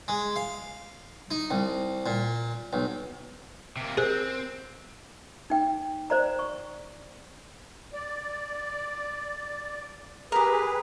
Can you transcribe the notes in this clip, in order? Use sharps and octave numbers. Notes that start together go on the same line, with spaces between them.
G#3
F5
D#4
C2
A#2
B1
C3 A#3
C4 G#4 A#4 C5 D#5
D#4 G5
C5 D5 A#5
C#6
D5
G4 G#4 A#4 B4